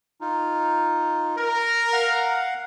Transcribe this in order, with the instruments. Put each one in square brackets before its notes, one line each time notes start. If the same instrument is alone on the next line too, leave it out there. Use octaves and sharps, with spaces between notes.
[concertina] D#4 F4
[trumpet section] A#4
[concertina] F5 F#5